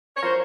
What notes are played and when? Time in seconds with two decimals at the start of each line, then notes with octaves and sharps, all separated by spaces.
0.16 C#5
0.22 F3 A#4 C5